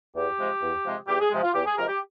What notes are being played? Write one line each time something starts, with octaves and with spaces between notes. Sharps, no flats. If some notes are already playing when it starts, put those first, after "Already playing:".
E2 G4
C3 F3 G#3
E2
C3 F3 G#3
E2 G4
G#4
C3 F3 G#3
F4
E2 G4
G#4
C3 F3 G#3 A#4
G4